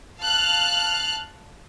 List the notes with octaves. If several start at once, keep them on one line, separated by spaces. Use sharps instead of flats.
F5 A5 F6 F#6